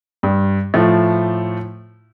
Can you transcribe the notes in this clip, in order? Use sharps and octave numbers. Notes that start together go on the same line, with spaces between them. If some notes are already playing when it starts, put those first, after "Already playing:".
G2
A2 F3 A3